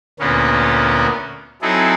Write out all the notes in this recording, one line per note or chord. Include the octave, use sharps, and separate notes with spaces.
D2 A#2 A#3 B3 C#4
F#3 C4 D#4 E4 G#4 A4